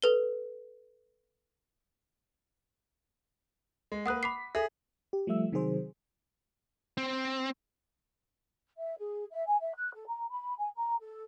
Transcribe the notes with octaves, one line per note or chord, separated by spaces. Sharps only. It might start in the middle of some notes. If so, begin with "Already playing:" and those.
A4 B4 G7
G#3
A#3 B4 F#5 D#6 F#6
B5 D6 B6 C7
G#4 A4 E5
G4
F3 G3 A3 E5 E6
C3 D#3 F#3 G#4 C5
C4
E5
G#4
E5
G#5
E5
F#6
A4
A#5
B5
G#5
A#5
A4